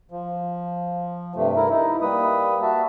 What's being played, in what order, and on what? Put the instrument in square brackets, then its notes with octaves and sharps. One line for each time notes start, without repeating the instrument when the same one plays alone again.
[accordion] F3
G2 C3 A3
E4 A#4
D#4 E4
G3 A#3 B4 D#6
F#4 E5 A5